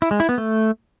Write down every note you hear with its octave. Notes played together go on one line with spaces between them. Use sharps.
E4
G#3
E4
B3
A3